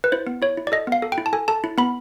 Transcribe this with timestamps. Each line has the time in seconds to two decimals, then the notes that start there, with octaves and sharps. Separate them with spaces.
0.04 B4
0.12 E4 C5
0.27 B3
0.42 E4 C#5
0.57 E4
0.67 D5
0.72 A4 D#5
0.87 B3
0.92 F5
1.02 A4
1.12 G5
1.18 E4
1.26 A5
1.33 A4 G#5
1.48 A4 A5
1.64 E4
1.78 B3 B5